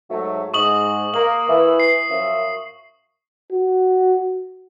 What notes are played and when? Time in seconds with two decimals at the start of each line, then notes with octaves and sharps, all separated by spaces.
0.10 G#2 F#3 A3
0.54 G#2 C#6 D#6 F#7
1.14 A#3 F#7
1.49 E3 E5
1.80 C7
2.09 F#2 F3 E5
3.52 F#4